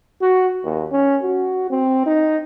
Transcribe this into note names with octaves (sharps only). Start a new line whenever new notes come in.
F#4
D#2
C#4
F#4
C4
D#4